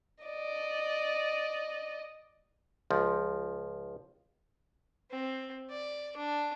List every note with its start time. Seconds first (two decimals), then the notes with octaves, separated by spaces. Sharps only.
0.24 D5 D#5
2.91 C#2 F3
5.10 C4
5.69 D5
6.17 D4